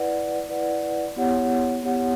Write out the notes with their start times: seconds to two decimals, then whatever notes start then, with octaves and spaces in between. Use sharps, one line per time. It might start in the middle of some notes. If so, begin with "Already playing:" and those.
Already playing: E4 B4 D5 F#5
0.49 E4 B4 D5 F#5
1.16 B3 E4 G4 C#5 F#5
1.83 B3 E4 G4 C#5 F#5